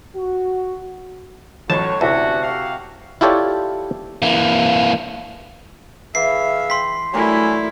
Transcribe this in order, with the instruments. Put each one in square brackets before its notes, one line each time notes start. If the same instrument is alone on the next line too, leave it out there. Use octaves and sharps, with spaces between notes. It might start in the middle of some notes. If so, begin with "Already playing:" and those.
[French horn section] F#4
[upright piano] A1 F#3 [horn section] A2 F#4 C#5 [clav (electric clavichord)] A5
[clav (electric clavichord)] D2 [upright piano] C3 E4 A4 [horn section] C#4 D4 F#4
[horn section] F#4 G4 F5
[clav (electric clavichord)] E4 F4 G4 A4 C#5 D5
[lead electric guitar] E3 A#3
[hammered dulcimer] E3 [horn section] G#4 E5 F5 [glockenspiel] C7
[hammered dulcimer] G5 [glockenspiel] C6 B6
[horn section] G2 F#3 G#5 [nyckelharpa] A3 E4 [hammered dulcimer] A#4 D5 G5